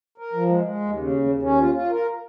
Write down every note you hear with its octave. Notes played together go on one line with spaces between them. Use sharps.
A#4
F3
G#3
G#3
D#2
C#3
D#2
D#2
C#4
F4
F4
A#4